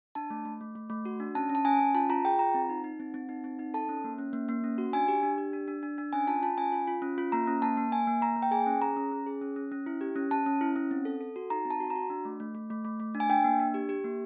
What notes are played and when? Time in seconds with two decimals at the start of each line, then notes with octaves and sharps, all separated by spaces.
0.15 D4 A5
0.30 A3
0.45 A3
0.61 A3
0.75 A3
0.90 A3
1.05 F#4
1.20 D4
1.35 C#4 A5
1.50 C#4
1.55 A5
1.65 C#4 G#5
1.80 C#4
1.95 F4 A5
2.10 F4 A#5
2.24 G#4 G5
2.39 F4 A#5
2.54 C4
2.69 D#4
2.84 D#4
3.00 C4
3.14 C4
3.29 D#4
3.44 C4
3.59 D#4
3.74 A4 A5
3.89 C#4
4.04 A#3
4.18 C#4
4.33 A#3
4.49 A#3
4.64 C#4
4.78 F#4
4.93 D4 G#5
5.08 G4
5.23 D4
5.38 G4
5.53 D4
5.68 D4
5.83 D4
5.98 D4
6.13 C#4 G#5
6.27 F4 A5
6.43 F4 A5
6.57 C#4 G#5
6.72 F4
6.87 F4
7.02 C#4
7.18 F4
7.32 A#3 A#5
7.47 C#4
7.62 A#3 A5
7.77 A#3
7.92 A#3 G#5
8.07 A#3
8.22 A#3 A#5
8.36 A#3
8.42 G5
8.51 G#4 G#5
8.66 C#4
8.82 G#4 A#5
8.97 C#4
9.11 C#4
9.26 G#4
9.41 C#4
9.56 C#4
9.72 C#4
9.86 E4
10.01 G4
10.16 C#4
10.31 C#4 A5
10.46 C#4
10.61 E4
10.76 C#4
10.91 C4
11.05 A4
11.21 A4
11.36 F#4
11.50 D#4 A#5
11.65 C4
11.71 A5
11.80 F#4
11.90 A#5
11.96 F#4
12.10 D4
12.25 A3
12.40 A3
12.55 A3
12.70 A3
12.85 A3
13.00 A3
13.15 D4
13.20 G#5
13.30 D4 G5
13.44 A#3
13.60 D4
13.74 G4
13.89 G4
14.04 A#3